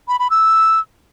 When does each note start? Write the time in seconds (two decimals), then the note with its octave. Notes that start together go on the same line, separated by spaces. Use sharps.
0.08 B5
0.19 B5
0.30 E6